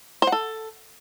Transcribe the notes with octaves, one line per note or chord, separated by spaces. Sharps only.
C5
F#5
A4